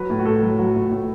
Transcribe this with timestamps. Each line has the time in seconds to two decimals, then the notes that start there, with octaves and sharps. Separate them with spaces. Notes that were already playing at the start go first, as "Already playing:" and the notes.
Already playing: F#3 B4
0.10 A2
0.19 F#4
0.25 A2 A4
0.42 F#3
0.59 F#3 F#4
0.76 A2
0.92 A2